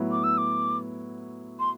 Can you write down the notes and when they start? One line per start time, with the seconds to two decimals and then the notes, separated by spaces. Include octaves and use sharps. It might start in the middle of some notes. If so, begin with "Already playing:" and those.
Already playing: A2 F#3 B3 E4
0.11 D6
0.24 E6
0.38 D6
1.59 C6